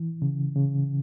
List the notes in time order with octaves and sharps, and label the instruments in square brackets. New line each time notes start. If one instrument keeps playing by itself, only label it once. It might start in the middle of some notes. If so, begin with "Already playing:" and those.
Already playing: [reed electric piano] E3
C#3
C#3